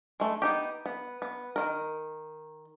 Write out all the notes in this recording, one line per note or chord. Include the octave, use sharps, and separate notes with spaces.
G#3 A3
B3 D#4 G4
B3
B3
D#3 A#4